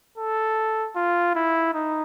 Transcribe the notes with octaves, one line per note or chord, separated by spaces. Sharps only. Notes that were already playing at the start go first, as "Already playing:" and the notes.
A4
F4
E4
D#4